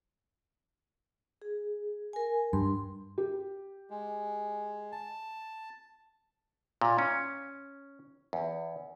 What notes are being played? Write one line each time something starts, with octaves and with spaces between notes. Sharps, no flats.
G#4
A#4 G#5
G2 C6
G4
G#3
A5
A#2
C#4
E2